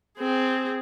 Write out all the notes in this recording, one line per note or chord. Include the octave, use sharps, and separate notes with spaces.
C4 G#4